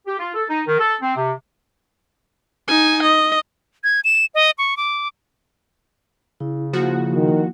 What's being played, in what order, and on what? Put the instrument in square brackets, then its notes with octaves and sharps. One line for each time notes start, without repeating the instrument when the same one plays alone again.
[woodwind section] G4
F4
A4
D#4
D#3
A4
C4
C3
[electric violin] D#4 G#5
D#5
[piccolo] G#6
E7
D#5
C#6
D6
[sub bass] C#3 [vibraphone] E4
[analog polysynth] F3 F#4 [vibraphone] A#3 E4
[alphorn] D#3